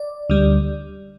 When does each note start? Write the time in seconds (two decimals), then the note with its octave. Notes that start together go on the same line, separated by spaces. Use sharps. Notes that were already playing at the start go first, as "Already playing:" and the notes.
Already playing: D5
0.30 D2 D3 G3